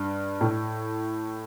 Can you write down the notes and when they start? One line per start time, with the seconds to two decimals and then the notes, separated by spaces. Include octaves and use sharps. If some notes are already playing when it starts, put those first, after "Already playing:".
Already playing: G2
0.41 A2